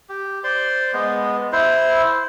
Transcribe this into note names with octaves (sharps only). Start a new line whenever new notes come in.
G4
C5 D5 C6
G#3 B3
E4 C5